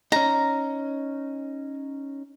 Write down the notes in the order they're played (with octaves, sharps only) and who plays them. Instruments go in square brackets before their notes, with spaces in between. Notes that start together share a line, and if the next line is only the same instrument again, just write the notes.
[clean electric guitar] C#4 D#4 [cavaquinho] A#5